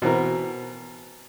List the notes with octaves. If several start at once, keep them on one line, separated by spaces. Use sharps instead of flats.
B2 E3 C4 A#4